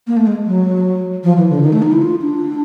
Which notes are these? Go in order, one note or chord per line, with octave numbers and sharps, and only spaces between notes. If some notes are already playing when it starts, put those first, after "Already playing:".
A#3
A3
G#3
F#3
F3
E3
D3
D#3
A3
D#4
E4
F4
D4